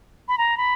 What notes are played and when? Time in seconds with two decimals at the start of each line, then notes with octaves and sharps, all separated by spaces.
0.28 B5
0.38 A#5
0.58 B5